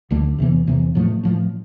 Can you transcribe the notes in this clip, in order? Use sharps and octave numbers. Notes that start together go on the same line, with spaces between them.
D2 D3 A3
E2 C3 E3 B3
E2 C3 E3 B3
A2 F3 A3
A2 F3 A3